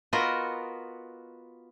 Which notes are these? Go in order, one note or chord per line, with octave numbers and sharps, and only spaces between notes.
B3 F4 F#4 A#4 D#5